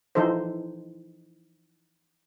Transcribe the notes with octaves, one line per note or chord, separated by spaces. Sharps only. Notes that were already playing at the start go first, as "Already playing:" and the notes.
E3 F3 D#4 A4 C5